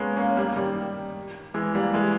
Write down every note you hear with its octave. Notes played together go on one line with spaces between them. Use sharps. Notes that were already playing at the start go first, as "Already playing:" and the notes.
Already playing: G#3 A#3 B3 C#4
A#3 C#4
G3 A#3
D#3 G3
E3 G#3
G3 A#3
E3 G#3